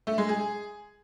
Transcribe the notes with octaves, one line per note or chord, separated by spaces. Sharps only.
A3
G#3
G#4